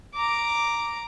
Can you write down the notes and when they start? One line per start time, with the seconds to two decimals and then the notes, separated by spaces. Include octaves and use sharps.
0.15 A#5 D6